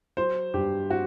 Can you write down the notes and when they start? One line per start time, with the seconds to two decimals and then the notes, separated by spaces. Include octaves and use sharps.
0.17 F#3 C5
0.54 G2 G4
0.90 C4 F#4